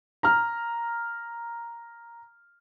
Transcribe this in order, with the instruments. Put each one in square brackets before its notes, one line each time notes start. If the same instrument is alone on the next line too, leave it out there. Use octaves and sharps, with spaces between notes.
[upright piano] A#5 F6